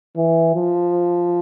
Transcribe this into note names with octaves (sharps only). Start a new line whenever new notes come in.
E3
F3